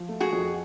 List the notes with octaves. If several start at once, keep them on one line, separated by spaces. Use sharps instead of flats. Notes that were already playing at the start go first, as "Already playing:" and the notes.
Already playing: F3
A3
F#4 G#4
F2